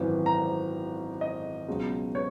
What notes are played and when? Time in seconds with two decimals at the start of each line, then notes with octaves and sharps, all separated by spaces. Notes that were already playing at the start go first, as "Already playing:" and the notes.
Already playing: G#1 F#2 E3
0.26 A#5
1.21 D#5
1.68 C#2 B2 F#3
2.15 C#5